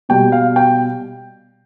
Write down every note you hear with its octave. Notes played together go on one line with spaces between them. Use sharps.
B2 G3 G5
F5
G5